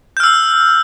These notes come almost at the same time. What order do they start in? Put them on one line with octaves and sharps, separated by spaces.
G6 F6 E6